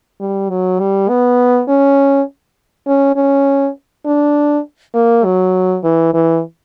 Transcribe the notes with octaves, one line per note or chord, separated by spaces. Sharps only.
G3
F#3
G3
B3
C#4
C#4
C#4
D4
A#3
F#3
E3
E3